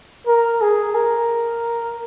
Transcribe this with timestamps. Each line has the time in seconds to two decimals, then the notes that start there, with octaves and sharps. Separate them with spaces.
0.27 A#4
0.61 G#4
0.95 A#4